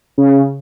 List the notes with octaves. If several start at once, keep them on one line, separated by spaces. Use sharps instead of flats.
C#3